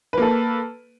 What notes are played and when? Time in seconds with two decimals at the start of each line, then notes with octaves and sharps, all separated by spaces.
0.13 B4
0.18 A#3
0.22 A4